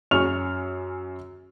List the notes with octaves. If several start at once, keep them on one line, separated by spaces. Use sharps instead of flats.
F#2 C#4 G#4 C#6 F6 F7